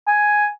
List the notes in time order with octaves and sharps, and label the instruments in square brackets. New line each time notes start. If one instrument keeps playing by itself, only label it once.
[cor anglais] G#5